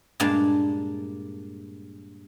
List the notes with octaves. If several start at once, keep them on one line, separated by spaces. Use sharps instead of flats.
G2 A#2 G#3 A#3 D4 A5